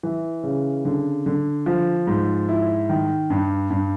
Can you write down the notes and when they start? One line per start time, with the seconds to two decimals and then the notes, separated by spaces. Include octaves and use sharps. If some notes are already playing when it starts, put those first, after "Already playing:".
0.03 E3
0.43 C#3
0.85 D3
1.26 D3
1.66 F3
2.07 G#2
2.49 E4
2.89 D#3
3.30 G2
3.70 G2